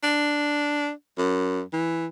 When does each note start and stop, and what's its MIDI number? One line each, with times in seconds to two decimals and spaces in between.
0.03 0.91 62
1.18 1.62 42
1.73 2.07 52